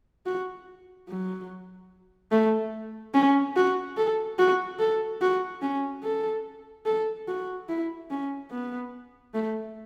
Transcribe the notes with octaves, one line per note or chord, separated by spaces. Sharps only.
F#4
F#3
A3
C#4
F#4
A4
F#4
A4
F#4
C#4
A4
A4
F#4
E4
C#4
B3
A3